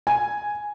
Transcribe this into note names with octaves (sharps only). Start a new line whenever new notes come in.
G#5